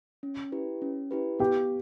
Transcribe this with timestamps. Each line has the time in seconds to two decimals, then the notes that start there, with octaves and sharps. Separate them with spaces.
0.23 C#4
0.52 E4 G4 B4
0.82 C#4
1.11 E4 G4 B4
1.39 B3 G4 G5